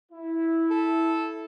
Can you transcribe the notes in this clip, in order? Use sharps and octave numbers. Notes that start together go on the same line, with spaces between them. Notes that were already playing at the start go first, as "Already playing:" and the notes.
E4
A4